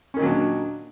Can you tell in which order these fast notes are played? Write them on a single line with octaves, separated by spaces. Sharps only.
C#4 D#3 A#2 F#3 D4